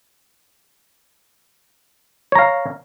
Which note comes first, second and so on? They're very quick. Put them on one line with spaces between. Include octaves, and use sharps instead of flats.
C#5 A#5 F5